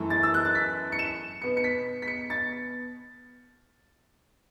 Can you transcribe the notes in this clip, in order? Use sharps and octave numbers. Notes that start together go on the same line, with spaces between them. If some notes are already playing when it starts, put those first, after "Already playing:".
Already playing: F#2 E3 A3
A6
E6
F#6
A6
B6
C#7
E7
B2 B3 C#7
C#7
B6
B6
C#7
A6